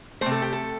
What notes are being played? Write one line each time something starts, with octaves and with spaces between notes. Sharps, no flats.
C3 A3 C5
A4
G4
A4